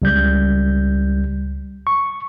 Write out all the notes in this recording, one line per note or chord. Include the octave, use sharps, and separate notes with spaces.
C#2 G3 G6
C#6